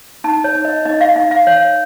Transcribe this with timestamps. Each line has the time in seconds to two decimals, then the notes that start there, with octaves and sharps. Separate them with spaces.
0.24 D#4 A5
0.44 C#5
0.55 D#4
0.65 D#5
0.85 D#4 D#5
1.01 F5
1.16 D#4 F5
1.31 F5
1.47 C#5